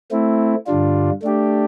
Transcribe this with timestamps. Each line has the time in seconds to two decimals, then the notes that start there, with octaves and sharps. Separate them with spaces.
0.11 A3 C4 E4
0.67 G2 D3 G3 D4 F4
1.22 A3 D4 G4